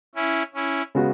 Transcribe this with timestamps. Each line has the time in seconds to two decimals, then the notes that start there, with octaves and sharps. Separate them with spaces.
0.15 C#4 E4
0.54 C#4 E4
0.95 C#3 G#3 B3 F#4